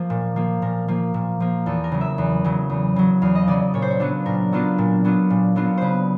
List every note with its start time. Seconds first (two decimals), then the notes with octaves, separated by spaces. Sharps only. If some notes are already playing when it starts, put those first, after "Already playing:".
Already playing: F3 A#3 A#4
0.10 A#2
0.36 F3 A#3
0.62 A#2 A#4
0.88 F3 A#3
1.14 A#2
1.40 F3 A#3
1.66 E2 A4
1.84 A#4
1.92 C#3 F#3
2.01 E5
2.18 E2
2.44 C#3 F#3
2.70 E2
2.96 C#3 F#3
3.22 E2 F5
3.35 D#5
3.48 C#3 F#3 D5
3.74 A#2 C#5
3.82 C5
3.90 C#5
4.00 F#3 B3 D4 F4
4.26 A#2 A#4
4.52 F#3 B3 D4 F4
4.78 A#2
5.04 F#3 B3 D4 F4
5.30 A#2
5.56 F#3 B3 D4 F4
5.78 C#3 B4 C5